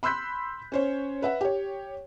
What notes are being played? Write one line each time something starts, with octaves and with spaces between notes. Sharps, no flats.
B5 C6 E6 F#6 G6 B6
C#4 C5 C#5
B4 E5 F#5
G4 C#5